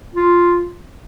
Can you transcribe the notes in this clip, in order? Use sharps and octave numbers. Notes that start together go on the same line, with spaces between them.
F4